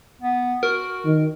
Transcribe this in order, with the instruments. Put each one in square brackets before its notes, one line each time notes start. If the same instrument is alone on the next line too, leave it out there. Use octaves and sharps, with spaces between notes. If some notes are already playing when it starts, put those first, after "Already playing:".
[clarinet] B3
[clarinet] F#4 [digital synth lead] A#4
[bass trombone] D#3